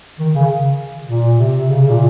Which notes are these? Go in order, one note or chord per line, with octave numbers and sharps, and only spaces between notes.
D#3
C#3
A#2
C3
C#3
A#2